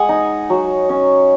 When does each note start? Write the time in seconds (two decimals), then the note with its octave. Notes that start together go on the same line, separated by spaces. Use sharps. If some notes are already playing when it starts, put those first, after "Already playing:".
Already playing: G#3 F#5 G#5
0.09 D#4
0.50 F#3
0.89 C#4